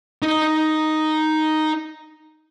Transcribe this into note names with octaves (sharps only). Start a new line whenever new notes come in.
D#4 D#5